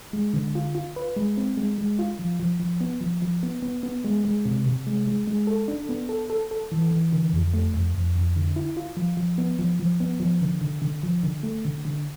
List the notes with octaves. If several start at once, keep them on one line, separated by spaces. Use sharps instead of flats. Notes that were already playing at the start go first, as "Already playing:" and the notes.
G#3
D3
F4
F4
B4
G#3
C4
G#3
G#3
F4
F3
F3
F3
B3
F3
F3
B3
B3
B3
G#3
G#3
C3
C3
G#3
G#3
G#3
A4
D4
B3
A4
A4
A4
E3
E3
D3
F2
A3
F2
F2
F2
D3
E4
F4
F3
F3
B3
F3
F3
B3
F3
D3
D3
D3
F3
D3
A3
D3
D3